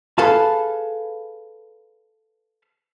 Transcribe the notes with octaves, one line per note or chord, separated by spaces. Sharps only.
G#4 A4 B4 F5 A5